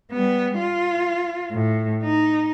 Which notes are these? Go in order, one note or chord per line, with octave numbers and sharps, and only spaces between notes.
G3 B3
F4
A2
D#4